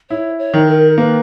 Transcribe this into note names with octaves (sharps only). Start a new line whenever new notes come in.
E4 C#5
C#5
D#3
A#4
A#3 B4